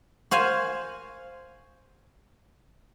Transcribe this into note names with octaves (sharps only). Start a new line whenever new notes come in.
F#4 C5 F5 G#5